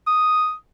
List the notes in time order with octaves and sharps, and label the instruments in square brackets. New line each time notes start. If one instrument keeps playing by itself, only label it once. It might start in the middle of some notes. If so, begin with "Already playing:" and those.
[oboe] D#6